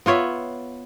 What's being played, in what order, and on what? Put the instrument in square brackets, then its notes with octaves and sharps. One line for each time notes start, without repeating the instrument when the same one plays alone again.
[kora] B3 F4 C#5 E5